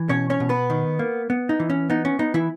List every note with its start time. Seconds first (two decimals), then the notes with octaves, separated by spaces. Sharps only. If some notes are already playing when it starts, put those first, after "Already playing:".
Already playing: E3
0.09 B2 C#4 C#5
0.30 C#4 C#5
0.40 B2
0.49 B3 B4
0.70 D#3
0.99 A#3
1.30 B3
1.49 D#4
1.60 E3
1.70 C#4
1.90 B3 D#4
2.05 C#4
2.19 B3 D#4
2.34 E3 E4